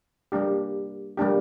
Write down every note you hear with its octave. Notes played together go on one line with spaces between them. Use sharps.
G3 A#3 D4 G4
G3 A#3 D4 G4